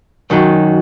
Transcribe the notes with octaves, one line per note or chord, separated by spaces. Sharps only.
F#2 D#3 F#3